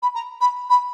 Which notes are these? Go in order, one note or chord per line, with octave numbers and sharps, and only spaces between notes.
B5
A#5
B5
B5